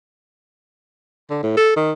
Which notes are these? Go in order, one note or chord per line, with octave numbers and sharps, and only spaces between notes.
D3
A2
A4
D#3